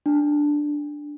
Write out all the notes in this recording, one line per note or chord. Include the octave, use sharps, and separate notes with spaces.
D4